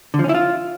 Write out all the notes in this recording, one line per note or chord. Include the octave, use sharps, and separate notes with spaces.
D3
F3
C#4
E4
F4